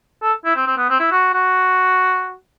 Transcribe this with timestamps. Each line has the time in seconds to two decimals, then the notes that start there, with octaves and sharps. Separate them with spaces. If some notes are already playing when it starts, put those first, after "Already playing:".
0.22 A4
0.45 E4
0.56 C4
0.67 C4
0.77 B3
0.90 C4
1.00 E4
1.11 F#4
1.33 F#4